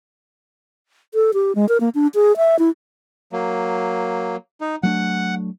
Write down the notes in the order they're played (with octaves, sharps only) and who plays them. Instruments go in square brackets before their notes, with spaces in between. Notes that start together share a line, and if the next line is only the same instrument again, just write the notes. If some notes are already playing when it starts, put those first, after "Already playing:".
[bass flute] A4
G4
G#3
A#4
A#3
D4
G#4
E5
E4
[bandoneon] F#3 A#3
D#4
[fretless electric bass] F#3 A3 D4 [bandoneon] F#5